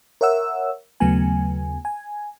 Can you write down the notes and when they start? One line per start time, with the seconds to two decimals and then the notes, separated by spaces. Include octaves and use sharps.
0.21 A#4 C#5 E5 F#5 E6
1.00 D#2 C#3 F#3 A3 B3 G#5
1.85 G#5